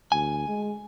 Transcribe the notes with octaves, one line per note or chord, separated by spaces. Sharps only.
D2 G#5
G#3